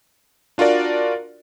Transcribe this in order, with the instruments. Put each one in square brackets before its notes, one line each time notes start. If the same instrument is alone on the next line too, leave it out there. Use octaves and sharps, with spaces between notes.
[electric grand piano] D4 F4 F#4 A#4 D5